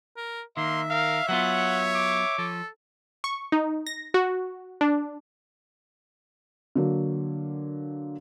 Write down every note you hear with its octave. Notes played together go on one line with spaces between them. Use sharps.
A#4
D#3 A#3 E5 C6
A#4 F5
F#3 B3 F4 C#5 F#5
D6
F3 A4
C#6
D#4
A#6
F#4
D4
D3 F#3 A#3